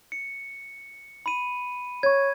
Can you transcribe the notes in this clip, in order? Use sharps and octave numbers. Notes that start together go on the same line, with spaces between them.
C#7
B5 D#7
C#5 C#6 G#6